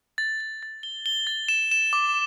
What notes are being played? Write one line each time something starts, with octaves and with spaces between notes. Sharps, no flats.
A6
A6
A6
G7
G7
A6
E7
E7
D6